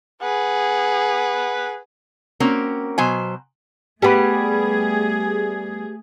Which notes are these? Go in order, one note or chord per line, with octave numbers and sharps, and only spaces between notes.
G#4 B4 F#5
A#3 C4 C#4 F#4 A#4
B2 F#3 C5 G#5
G3 A3 B3 G4 G#4 B4